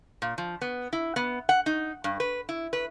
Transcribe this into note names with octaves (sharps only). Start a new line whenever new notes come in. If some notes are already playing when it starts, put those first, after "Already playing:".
A#2
F3
B3
E4
B3
F#5
D#4
G2
B4
E4
B4